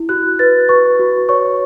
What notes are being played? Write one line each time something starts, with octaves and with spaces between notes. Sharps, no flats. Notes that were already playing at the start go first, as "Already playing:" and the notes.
Already playing: E4
F#4 F#6
B4 A6
B4 C#6
F#4
C#5 C#6